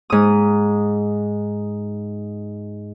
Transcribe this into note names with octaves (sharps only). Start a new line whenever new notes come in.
G#2 D#6